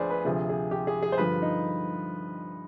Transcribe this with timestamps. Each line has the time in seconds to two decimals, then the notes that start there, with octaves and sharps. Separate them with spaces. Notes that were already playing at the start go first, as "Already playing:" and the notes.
Already playing: D2 D3 F3 G#4 B4 C5 D5
0.10 B4
0.25 D2 C3 F3 G#4
0.49 G#4
0.71 G4
0.87 G#4
1.03 G#4
1.12 C5
1.18 G2 D3 F3 B4
1.42 D#4